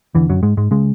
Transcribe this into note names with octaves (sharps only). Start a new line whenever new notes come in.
E2 D3 E3
F#2 F#3
G#2 G#3
G#2 G#3
C#3 G#3